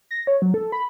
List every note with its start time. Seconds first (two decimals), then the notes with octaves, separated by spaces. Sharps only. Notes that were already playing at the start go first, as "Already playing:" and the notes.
0.11 A#6
0.27 C#5
0.42 F#3
0.54 A4
0.72 B5